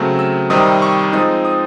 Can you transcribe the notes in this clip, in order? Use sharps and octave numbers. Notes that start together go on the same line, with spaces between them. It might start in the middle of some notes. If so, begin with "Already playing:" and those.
Already playing: C#3 F#3 A3 C4
E6
C3 D#3 G3 C4 D#4 D#6
C#6
F3 G#3 C4 D#4 D#6
D#6